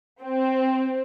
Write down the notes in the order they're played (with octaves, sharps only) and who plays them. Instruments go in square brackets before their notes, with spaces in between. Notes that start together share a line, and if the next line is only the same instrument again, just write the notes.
[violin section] C4